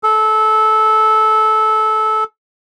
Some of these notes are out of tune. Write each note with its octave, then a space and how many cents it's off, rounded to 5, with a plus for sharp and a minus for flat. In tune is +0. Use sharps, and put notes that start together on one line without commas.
A4 -20